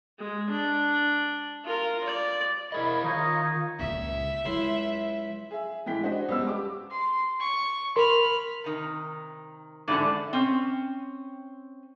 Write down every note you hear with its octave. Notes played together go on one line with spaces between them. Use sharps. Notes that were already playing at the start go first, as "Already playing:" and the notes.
G#3
D4
F4 A#4
D5
E4 G#4 A#4 C#5 D#5 E5 B5
D#3 D#4 F4 C#5 D#5 F5 D#6
C#2 A#2 E5
C#2 F#3 E4 C6
G#4 E5
A2 E3 G#3 G5 B6
D4 F#4 C5 D#5
C#2 G3 B3 E6
G4 D6
C6
C#6
A#4 B5 C6 F6
C3 D#3
E2 G#2 D3 A3 D5 A5
C4 C#4